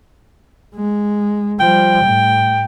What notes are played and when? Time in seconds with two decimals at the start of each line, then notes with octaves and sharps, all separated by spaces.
0.75 G#3
1.60 F3 G3 G5
2.05 A2